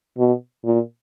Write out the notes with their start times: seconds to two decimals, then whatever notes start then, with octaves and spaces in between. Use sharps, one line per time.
0.18 B2
0.65 A#2